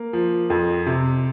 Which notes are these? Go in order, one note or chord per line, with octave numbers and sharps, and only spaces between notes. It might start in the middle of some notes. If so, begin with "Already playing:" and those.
Already playing: A#3
F3
F2
C3